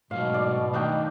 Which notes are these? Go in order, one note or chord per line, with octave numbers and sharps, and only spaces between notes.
G#2 B2 F#3 A3 F5
D5
D#3 A3 D4 D#4 G5